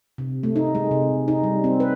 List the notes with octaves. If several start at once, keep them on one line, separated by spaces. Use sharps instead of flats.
C3
A3
D#4
G#3
C3
D#4
G3
C4
B4